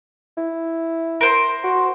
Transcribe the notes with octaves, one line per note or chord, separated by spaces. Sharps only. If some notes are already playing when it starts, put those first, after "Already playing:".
E4
A#4 C5
F#4